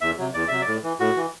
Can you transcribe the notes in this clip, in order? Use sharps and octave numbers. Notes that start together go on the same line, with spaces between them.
E2 E5
C3 F#3
E2 D5
C3 F#3 E5
D5
A2
E3
A2 F#4
E3